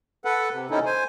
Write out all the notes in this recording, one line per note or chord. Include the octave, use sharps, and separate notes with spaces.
A4 B4 F#5
C3
C3 D#3 C#4 D#4 E4 A4
C5 G#5